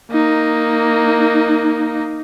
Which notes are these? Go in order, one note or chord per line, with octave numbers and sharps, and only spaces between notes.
A#3 D#4